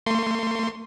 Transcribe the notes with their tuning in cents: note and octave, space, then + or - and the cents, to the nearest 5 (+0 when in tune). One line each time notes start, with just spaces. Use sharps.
A3 +45 C6 +0